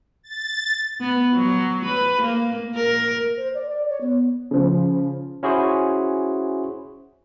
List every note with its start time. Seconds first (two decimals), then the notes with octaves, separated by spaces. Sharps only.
0.23 A6
1.01 B3
1.35 F#3
1.86 B4
2.23 A#3
2.76 A#4
3.37 C5
3.54 D5
3.68 D5
3.89 C#5
4.01 B3
4.51 C#3 F3
5.43 C#4 E4 F#4 G#4 C5